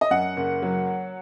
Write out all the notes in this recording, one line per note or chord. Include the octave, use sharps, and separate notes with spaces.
D#5
F#2 F#5
F#1
F#3